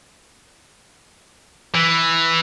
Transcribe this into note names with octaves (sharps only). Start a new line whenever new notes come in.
E3